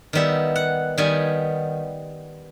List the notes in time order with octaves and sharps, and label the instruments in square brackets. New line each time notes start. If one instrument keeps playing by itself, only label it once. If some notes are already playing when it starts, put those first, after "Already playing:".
[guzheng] D#3 G3 B3 E5
F#5
D#3 G3 B3 G#5